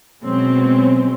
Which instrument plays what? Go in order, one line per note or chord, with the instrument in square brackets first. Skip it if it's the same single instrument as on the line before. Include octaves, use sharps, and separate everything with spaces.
[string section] B2 F#3 G#3 C4 C#4